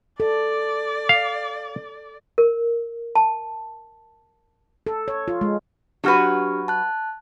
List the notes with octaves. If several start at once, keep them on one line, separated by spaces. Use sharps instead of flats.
A4 D5
F5
A#4
A5
A4
C#5
F4
G#3
F#3 D4 F#4 G4 B4 F6
A5 F#6